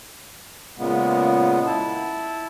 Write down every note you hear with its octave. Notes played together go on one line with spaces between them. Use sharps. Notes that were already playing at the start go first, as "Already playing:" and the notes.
A#2 C#3 G#3 B3
E4 A5